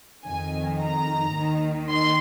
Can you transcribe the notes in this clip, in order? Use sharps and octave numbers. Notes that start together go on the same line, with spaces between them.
F2 D#3 G#5
A#5
D#2 D#3
C6